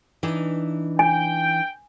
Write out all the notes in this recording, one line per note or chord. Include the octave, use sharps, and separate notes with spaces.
E3 D4 D#4
G5 G#5